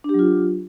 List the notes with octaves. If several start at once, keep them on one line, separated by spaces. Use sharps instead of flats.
F#3 D4 F4 G4